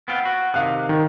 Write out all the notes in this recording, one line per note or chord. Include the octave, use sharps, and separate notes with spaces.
B3 C4 F4
F#4
C3 D#3 F5 F#6
D#3